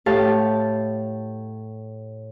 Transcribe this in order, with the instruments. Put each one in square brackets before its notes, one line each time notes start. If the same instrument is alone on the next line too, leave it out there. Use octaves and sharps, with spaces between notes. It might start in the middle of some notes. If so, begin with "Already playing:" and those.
[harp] A2 G4 A4 F5 A5